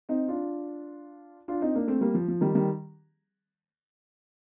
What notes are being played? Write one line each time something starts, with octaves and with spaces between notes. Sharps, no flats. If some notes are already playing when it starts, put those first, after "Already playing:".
C4 D#4
D4 F4
D4 F4
C4 D#4
A#3 D4
A3 C4
G3 A#3
F3
F3
D#3 G3
D#3 G3